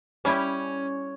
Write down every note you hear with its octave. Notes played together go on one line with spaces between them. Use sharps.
G3 C#4 E4 G4